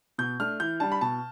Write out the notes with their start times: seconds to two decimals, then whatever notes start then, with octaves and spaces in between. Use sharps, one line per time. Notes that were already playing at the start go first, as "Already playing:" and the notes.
0.18 B2 G6
0.40 A3 D4 F6
0.60 E3 G6
0.80 G3 D4 A5
0.92 B5
1.01 B2 A5